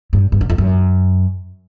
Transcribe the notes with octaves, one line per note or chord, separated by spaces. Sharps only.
G2
G2
F#2
F2
F#2